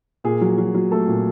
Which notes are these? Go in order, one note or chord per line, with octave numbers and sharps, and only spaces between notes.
A#2 G#4
F#3
F#3
F#3
A3 A4
A#2